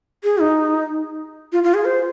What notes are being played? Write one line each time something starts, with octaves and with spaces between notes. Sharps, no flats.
G#4
D#4
F4
F4
G#4
C5